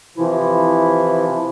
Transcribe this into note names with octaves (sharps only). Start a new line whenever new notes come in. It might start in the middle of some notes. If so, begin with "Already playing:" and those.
C3 E3 F3 E4